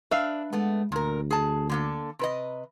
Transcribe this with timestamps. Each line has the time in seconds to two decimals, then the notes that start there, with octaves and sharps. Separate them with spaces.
0.11 D4 B4 E5 F5
0.53 G#3 A3 B3
0.92 D2 A#2 A#4
1.31 G#4 A5
1.69 D3 A#3 A4
2.19 C3 B4 D#5